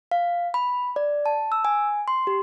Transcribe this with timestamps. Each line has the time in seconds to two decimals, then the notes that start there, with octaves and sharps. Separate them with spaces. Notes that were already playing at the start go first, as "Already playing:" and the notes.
0.11 F5
0.54 B5
0.96 D5
1.26 A5
1.52 E6
1.65 G#5
2.08 C6
2.27 G4